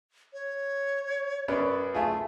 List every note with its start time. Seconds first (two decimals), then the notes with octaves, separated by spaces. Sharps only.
0.33 C#5
1.48 F#2 B3 D5
1.94 A3 F4 G#4